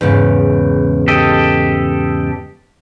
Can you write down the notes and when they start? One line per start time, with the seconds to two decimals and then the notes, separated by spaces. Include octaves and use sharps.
0.01 E2 G#2 C#3
1.08 G4 A4 D#5